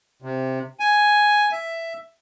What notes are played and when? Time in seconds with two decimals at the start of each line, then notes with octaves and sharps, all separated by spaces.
0.22 C3
0.80 G#5
1.52 E5